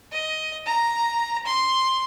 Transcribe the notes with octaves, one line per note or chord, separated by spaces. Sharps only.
D#5
A#5
C6